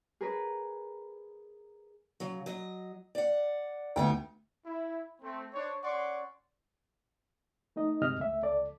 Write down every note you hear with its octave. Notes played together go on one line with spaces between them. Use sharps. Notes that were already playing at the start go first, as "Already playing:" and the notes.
G#4 A#4 B4
C#3 F#3
F#3 D#5
D5 F#5
D2 B3 D#4 G5
E4
A3 C4
D4 C5 C#5
C#4 D5 F#5 C6 C#6
A3 D#4 D#5
G2 C3 G#3 D#5 F6
C#2 A3 E5
C#2 A4 D5